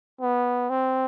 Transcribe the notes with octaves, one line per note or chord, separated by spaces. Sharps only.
B3
C4